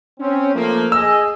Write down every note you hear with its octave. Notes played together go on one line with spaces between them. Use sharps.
C4 C#4
F3 A3 A#3
G#4 D#5 E6